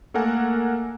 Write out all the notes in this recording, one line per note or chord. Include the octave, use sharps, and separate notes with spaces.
A3 A#3 A4 A#4 F#5 G#5